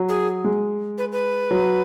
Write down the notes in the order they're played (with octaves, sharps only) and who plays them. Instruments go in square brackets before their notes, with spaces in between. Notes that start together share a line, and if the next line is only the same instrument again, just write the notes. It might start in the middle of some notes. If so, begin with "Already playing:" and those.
Already playing: [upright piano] F#3
[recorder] G#4
[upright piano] G#3
[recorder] B4
B4
[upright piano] F#3